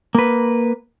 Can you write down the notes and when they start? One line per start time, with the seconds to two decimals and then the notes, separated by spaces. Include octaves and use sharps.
0.15 A#3 B4